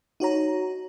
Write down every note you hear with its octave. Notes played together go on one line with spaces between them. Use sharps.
D#4 F#4 C#5 A#5